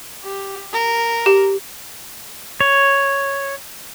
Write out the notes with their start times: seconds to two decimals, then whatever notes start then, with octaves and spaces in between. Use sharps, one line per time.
0.23 G4
0.73 A#4
1.26 G4
2.60 C#5